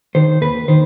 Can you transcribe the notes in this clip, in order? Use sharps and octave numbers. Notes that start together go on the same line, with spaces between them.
D#3 C5
D#2 B4
D#3 C5